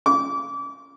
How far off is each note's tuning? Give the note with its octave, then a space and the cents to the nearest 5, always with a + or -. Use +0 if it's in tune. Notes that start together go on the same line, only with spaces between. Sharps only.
D6 -30